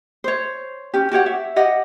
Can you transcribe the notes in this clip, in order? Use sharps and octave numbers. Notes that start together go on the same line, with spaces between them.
C5 C#5
C#4 G4
F#4 G4 C#5 F#5
E5
G4 D#5 F#5